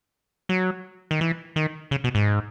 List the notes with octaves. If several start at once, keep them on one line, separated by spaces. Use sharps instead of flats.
F#3
D#3
E3
D#3
C#3
B2
G#2